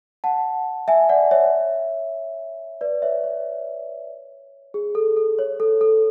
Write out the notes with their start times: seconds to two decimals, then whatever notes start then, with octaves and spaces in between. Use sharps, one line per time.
0.24 F#5 A5
0.88 E5 G#5
1.09 D5 F#5
1.31 C#5 E5
2.81 B4 D5
3.02 C#5 E5
3.24 C#5
4.74 G#4
4.95 A4
5.17 A4
5.39 C#5
5.60 A4
5.81 A4